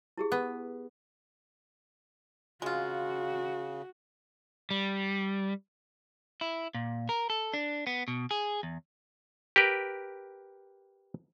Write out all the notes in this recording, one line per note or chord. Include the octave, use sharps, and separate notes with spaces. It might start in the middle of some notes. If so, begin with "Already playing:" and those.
E4 G4 G#4
B3
C#3 G#3 F4 F#4
G3
E4
A#2
A#4
A4
D4
B3
B2
G#4
E2
G4 A#4 B4